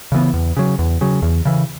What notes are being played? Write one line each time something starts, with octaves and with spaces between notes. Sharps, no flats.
C#3 E3 B3
E2
C#3 F#3
E2
C#3 F#3
E2
C#3 E3